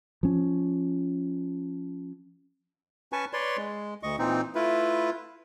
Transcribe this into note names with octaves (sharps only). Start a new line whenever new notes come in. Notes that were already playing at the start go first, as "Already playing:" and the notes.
F3 C#4
C#4 B4 G#5 A5 C#6
B4 C#5 D5 C6
G#3
D2 D#5 C#6
A#2 E3 C4 D#4
A3 E4 F4 B4